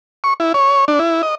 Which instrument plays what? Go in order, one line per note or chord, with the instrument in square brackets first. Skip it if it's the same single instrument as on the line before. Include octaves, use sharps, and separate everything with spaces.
[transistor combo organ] C#6
E4
C#5
D4
E4
D#5